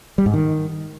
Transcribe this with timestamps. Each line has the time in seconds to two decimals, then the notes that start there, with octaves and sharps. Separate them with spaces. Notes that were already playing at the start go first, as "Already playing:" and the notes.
0.18 G3
0.26 G#2
0.34 D#3